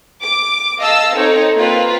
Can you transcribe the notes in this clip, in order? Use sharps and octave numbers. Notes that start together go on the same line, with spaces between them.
D6
D#5 F5 A5 E6
C4 D#4 A4 C#5
A#3 C4 F4 B4